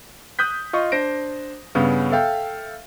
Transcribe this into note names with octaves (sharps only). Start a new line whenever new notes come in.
D#6 F#6 G6 B6
F4 D#5 C#6
D4 C5 A#6 D7
G2 C#3 B3 C#4
A4 E5 F5 G5